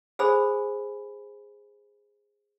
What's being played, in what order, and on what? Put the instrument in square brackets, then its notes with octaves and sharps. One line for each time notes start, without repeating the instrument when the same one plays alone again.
[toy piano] G#4 A4 C5 G#5 B5